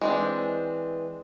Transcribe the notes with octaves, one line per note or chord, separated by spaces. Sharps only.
E3 G#3 C4 D4